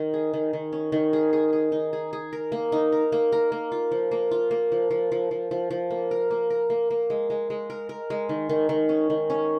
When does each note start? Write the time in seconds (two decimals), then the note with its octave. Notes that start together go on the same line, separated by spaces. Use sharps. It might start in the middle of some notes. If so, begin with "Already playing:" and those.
Already playing: D#3
0.14 G#4
0.33 D#3
0.53 D#3
0.73 C#4
0.92 D#3
1.13 G#4
1.33 G#4
1.53 G#4
1.72 D#4
1.93 G#4
2.13 G#4
2.33 A#4
2.52 A#3
2.72 D#4
2.92 A#4
3.12 A#3
3.32 A#4
3.52 A#3
3.72 F4
3.91 F3
4.11 A#3
4.31 F4
4.51 A#3
4.72 F3
4.91 F3
5.12 F3
5.31 F3
5.51 F3
5.71 F3
5.90 A#3
6.11 A#4
6.31 A#3
6.50 A#4
6.70 A#3
6.90 A#3
7.10 G#3
7.30 G#3
7.50 G#3
7.70 A#4
7.89 A#4
8.10 G#3
8.29 D#3
8.49 D#3
8.69 D#3
8.89 C#4
9.10 D#3
9.30 C#4